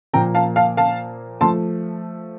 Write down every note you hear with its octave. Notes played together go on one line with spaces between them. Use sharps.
A#2 F3 A#3 G5 A#5
F5 A5
F5 A5
F5 A5
F3 A3 A5 C6